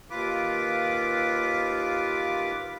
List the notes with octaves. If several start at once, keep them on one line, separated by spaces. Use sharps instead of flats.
D#2 F4 B4 D6